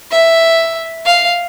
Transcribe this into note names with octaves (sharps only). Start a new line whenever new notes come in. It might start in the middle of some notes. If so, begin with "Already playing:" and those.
E5
F5